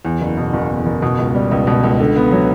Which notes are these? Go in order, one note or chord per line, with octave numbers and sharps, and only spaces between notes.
E2
F#1
B2
F#1
E2
F#1
B2
C#2
G3
C#2
B2
C#2
D3
B3
F#3